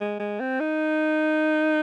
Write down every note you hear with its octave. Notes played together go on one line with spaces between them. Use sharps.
G#3
G#3
C4
D#4